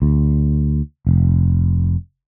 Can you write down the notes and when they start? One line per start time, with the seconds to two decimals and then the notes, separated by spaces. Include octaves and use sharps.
0.02 D2
1.07 F1